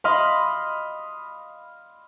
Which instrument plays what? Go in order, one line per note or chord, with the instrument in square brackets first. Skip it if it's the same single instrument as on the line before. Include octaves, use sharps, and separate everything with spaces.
[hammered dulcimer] D#5 F5 B5 C6